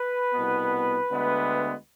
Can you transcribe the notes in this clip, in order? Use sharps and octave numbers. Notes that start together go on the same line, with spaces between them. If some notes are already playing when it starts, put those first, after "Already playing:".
Already playing: B4
C2 B2 B3
D2 D3 G#3 B3